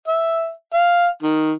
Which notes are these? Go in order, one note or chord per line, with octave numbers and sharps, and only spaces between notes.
E5
F5
D#3